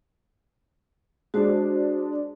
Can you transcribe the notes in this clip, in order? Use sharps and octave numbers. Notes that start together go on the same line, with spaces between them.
G#3 D4 F#4 C5